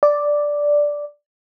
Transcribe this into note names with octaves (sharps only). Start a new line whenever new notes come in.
D5